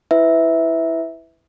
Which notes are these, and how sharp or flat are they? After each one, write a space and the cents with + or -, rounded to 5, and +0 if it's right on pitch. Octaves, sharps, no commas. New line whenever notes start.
E4 +0 B4 +20 E5 -10